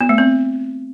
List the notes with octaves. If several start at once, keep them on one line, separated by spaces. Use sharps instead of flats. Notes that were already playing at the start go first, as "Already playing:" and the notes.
B3
A3
C4